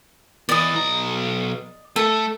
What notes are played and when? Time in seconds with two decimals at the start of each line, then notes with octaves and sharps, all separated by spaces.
0.49 E2 E3 D5 D#5
0.75 B1 A#5
1.96 A3 A4